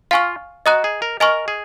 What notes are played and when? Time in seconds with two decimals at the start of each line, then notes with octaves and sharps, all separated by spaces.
0.11 F4 F5 G#5 C#6 F6
0.66 F#4 D#5 A#5 D#6 F#6
0.84 G#4
1.02 A#4
1.20 A#4 D#5 G#5 C#6 F6
1.48 G#4